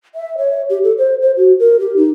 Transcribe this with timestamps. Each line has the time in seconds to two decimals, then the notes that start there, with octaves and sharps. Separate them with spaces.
0.15 E5
0.38 C#5
0.70 G4
0.84 A4
0.98 C5
1.22 C5
1.37 F#4
1.59 A#4
1.80 G4
1.97 D#4